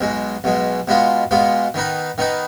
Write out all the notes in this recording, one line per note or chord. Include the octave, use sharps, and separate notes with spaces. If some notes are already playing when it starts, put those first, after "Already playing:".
B1 B2 G#3
B1 B2 G#3
B2 G#3 B3 F4
B2 G#3 B3 F4
D#3 B3 D#4 B4
D#3 B3 D#4 B4